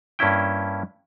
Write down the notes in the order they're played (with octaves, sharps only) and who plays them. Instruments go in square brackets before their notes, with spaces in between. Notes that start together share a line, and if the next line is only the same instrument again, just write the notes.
[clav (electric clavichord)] G2 A#3 C#4 E4 G5